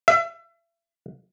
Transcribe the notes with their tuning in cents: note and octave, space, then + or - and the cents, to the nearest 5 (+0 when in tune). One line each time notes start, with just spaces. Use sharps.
E5 +35